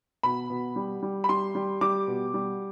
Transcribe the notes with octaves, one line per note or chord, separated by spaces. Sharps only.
B2 B5
B2
G3
G3
B5
G3 C6
G3
G3 D6
B2
G3